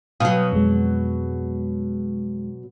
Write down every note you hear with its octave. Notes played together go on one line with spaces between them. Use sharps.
B2 F#3 F5 G5 D#6
F2 G#3